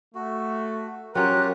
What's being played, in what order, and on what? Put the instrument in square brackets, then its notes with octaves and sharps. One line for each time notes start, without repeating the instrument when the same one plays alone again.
[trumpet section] A3 [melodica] F#4
[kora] F#3 C#4 [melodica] F4 G4 [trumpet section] A#4 [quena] F#6